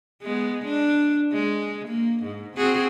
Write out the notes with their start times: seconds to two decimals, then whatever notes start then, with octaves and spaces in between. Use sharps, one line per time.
0.23 G#3 B3
0.65 D4
1.32 G#3
1.88 A#3
2.23 G#2
2.57 C4 F#4 G#4